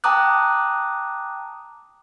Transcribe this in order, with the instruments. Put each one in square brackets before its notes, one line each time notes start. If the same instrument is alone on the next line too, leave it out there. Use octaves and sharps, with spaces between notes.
[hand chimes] G5 A5 A#5 D6 D#6 F#6